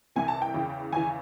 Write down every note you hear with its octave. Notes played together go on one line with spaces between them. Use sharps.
C2 C3 E3 G#5
A5
G5
E2 C#3 E3
E2 C#3 E3 G#5